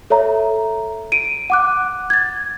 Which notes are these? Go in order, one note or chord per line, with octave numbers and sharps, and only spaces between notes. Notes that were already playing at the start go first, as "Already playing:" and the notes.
A4 C#5 E5 A#5
D7 D#7
F#5 D6 F#6
G#6 A6